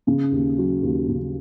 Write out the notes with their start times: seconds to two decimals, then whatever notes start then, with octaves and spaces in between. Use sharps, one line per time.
0.07 C#3
0.32 D#2
0.58 F#3
0.83 D#2
1.08 C#3